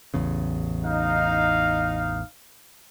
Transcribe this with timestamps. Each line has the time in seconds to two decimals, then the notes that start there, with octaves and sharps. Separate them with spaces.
0.14 A1 E2 C#3
0.83 D#4 F5